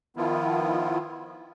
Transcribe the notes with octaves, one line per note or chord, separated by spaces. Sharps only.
D#3 F3 B3 E4 F4